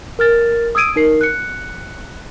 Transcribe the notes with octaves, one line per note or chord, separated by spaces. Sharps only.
A#4 F6 A6
D#6 E6 G#6 D7 D#7
D#4 A#4 C7
F#6 C#7